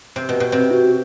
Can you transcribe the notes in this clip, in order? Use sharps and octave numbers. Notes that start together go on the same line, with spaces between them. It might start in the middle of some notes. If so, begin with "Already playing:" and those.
C3
B2
B2
C3 C4
F#4